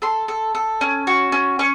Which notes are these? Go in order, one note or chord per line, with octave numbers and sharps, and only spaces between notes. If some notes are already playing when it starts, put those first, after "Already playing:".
A4 C6
A4
A4
C#4
F#4
C#4
C#4 C#6